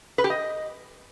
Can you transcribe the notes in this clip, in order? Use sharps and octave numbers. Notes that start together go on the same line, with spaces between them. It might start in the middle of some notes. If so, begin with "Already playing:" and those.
B4
G4
D#5